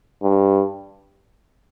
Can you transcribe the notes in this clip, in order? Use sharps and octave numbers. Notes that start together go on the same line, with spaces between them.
G2